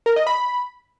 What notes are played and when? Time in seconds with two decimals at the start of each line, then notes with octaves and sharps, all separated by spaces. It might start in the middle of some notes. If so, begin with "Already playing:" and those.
0.06 A#4
0.16 D#5
0.27 B5